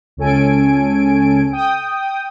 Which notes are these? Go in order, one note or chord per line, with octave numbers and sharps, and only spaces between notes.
C#2 C#4 A4 G#5 D7
G5 D#6